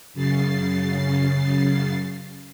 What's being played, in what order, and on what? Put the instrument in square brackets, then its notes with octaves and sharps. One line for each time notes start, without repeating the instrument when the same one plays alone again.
[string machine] F#2 C#3 A6 C7